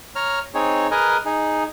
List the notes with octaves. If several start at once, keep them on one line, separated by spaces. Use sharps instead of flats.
C#5 A#5 F6
C4 D#4 G#4 C#5
G#4 A#4 B4 D#5 G#5 A#5
D#4 G#4